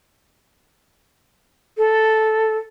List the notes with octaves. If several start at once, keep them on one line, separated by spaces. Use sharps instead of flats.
A4